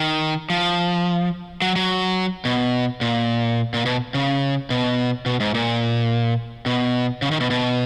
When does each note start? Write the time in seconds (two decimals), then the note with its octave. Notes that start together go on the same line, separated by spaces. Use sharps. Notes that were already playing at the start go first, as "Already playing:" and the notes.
Already playing: D#3
0.50 F3
1.62 F#3
1.76 F#3
2.45 B2
3.01 A#2
3.74 A#2
3.86 B2
4.14 C#3
4.70 B2
5.26 B2
5.40 G#2
5.54 A#2
6.66 B2
7.22 C#3
7.31 D#3
7.40 B2
7.50 B2